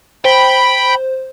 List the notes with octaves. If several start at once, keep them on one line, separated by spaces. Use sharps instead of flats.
C5 G5 B5